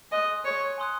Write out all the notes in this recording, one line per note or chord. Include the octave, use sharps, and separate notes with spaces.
D#5 G#5 C6 D#6 F#6
C#5
G#5 C6 D#6 F#6